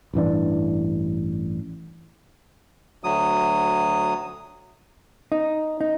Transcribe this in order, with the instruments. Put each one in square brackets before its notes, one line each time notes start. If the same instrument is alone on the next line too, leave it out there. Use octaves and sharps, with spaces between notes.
[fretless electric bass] A1 G2 E3 D4
[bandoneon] D2 F#3 D#6
[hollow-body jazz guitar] D#4
D#4